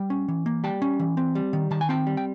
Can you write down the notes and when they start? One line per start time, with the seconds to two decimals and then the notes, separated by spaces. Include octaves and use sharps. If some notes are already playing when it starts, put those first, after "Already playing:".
Already playing: G3 G5
0.10 C#4
0.28 E3
0.46 A#3
0.64 G3 G5 A5
0.82 C#4
1.00 E3
1.17 C4
1.35 G3
1.53 D#3
1.71 D#3 A5
1.81 G#5
1.89 C4 G5 A5
2.07 G3
2.17 G5